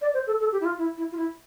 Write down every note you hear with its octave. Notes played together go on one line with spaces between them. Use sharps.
D5
C5
A4
A4
G4
E4
F4
E4
E4
F4
E4